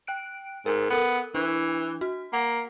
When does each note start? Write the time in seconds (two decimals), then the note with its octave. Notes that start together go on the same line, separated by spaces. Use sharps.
0.07 G5 F#6 D7
0.66 G#2 A#4
0.90 B3 A4 A#4
1.35 E3 D4
2.01 F#4
2.33 A#3 F#5